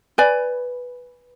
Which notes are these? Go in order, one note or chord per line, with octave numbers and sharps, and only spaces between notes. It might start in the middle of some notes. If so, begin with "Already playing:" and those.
B4 D5 G#5